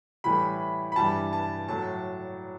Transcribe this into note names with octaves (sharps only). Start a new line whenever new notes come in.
A2 E3 G3 B5
B5
G2 E3 G3 A5
A5
A2 F#3 A5